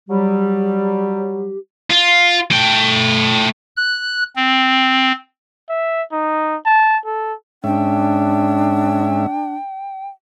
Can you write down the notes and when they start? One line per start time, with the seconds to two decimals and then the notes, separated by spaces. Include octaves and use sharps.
0.09 F#3 G3 G4
1.91 F4
2.51 A3 G5
3.77 F#6
4.36 C4
5.69 E5
6.12 D#4
6.66 A5
7.05 A4
7.64 G#2 C#4 D4 E5 G5